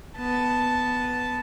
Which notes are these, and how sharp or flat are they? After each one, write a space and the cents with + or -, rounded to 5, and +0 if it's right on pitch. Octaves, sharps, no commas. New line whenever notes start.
B3 +0 A5 -5